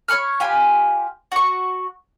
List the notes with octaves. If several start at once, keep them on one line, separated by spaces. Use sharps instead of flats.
C#5 B5 C#6 F6
F4 G4 G#5 B5
F#4 C#6